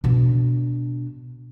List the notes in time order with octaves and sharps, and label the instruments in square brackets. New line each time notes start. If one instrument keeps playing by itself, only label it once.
[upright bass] B2 D4